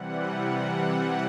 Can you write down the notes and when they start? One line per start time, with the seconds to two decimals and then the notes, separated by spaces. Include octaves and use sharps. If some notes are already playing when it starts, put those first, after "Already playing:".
Already playing: C3 E3 G3 F#5
0.29 F#5